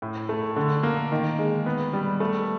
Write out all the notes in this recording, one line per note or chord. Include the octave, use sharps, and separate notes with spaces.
A2
A3
D3
A#3
D#3
G#3
B3
G3
A3